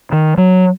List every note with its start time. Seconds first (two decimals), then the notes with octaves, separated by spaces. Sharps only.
0.12 D#3
0.38 F#3